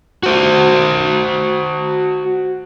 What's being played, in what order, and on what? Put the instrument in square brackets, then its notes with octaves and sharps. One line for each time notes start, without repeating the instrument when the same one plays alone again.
[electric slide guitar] F#4 C5